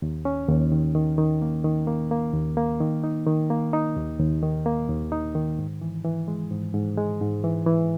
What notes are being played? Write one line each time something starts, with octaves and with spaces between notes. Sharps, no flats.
D#2
C#4
D#2
D#3
D#3
D#3
A#3
D#3
A#3
A#3
D#2
A#3
D#3
D#4
D#3
A#3
D#4
D#2
D#2
D#3
A#3
D#2
D#4
D#3
G#2
E3
E3
G#3
G#2
G#2
G#3
G#2
E3
E3